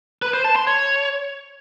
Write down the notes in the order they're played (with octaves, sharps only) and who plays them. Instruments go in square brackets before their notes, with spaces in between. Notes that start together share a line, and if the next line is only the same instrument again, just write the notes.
[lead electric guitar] B4
C5
A5
C6
C#5